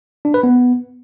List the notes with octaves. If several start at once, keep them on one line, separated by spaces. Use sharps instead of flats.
D4
B4
B3